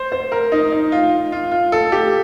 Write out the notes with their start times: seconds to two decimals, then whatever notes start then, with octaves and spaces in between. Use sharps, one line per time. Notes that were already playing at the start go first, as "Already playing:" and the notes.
Already playing: C5
0.12 C5
0.32 A#4
0.52 D#4
0.72 D#4
0.92 F4
1.32 F4
1.51 F4
1.72 A4
1.92 G4